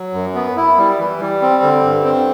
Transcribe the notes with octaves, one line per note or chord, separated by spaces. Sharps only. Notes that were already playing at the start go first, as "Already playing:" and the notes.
Already playing: F#3
F#2
B3
E4
G3
E3
G3
C4
D3
G2
C4